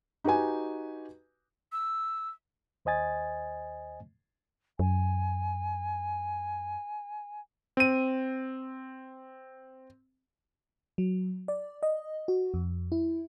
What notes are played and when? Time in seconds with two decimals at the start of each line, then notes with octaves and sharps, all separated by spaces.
0.24 D#4 F#4 G4 B4 G#5
1.72 E6
2.85 D#2 C5 D#5 G#5 A6
4.79 F#2 G#5
7.77 C4 D#7
10.98 F#3
11.48 D5
11.83 D#5
12.28 F#4
12.54 F2
12.92 E4